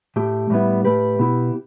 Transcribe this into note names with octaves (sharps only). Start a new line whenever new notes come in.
A2 A3 G4
A2 G3 B3 E4
A2 A3 G4 B4
B2 B3 E4 G4